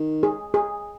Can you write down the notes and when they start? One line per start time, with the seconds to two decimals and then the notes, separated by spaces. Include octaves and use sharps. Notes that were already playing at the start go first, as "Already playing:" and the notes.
Already playing: D#3
0.23 G#4
0.54 G#4